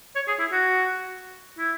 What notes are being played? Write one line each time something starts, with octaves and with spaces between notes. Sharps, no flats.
C#5
G#4
E4
F#4
E4